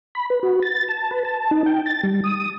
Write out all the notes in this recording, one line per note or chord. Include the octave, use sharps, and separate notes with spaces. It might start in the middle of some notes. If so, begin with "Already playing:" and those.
B5
B4
F#4
A6
A5
B4
A5
D#4
G5
A6
G3
D#6